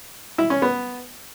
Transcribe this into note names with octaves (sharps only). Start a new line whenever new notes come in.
E4
C#4
B3